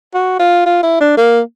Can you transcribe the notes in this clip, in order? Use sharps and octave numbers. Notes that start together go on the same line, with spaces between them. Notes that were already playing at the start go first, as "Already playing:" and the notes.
F#4
F4
F4
E4
D4
A#3